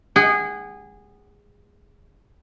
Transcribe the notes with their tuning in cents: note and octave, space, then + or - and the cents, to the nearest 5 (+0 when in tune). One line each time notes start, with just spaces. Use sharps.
G#4 -20 F#5 +25